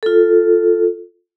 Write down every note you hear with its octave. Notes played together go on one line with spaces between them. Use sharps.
F4 A4